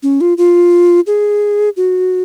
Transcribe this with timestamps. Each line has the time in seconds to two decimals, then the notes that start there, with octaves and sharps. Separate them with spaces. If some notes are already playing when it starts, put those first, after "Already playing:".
0.03 C#4
0.21 F4
0.38 F4
1.07 G#4
1.77 F#4